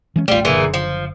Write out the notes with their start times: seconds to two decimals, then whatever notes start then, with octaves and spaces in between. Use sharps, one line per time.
0.16 E3 G#3 C#4
0.28 D#1 A1 G3 A3 F4
0.45 F#1 A#2 D3 E3 G#4
0.74 F3